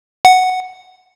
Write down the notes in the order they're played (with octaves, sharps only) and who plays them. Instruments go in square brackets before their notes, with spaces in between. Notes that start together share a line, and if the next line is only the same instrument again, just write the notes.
[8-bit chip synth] F#5